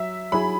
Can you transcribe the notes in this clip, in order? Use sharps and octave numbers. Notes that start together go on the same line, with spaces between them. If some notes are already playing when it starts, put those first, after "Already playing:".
Already playing: F#3 E5
F#3 E4 G#4 B5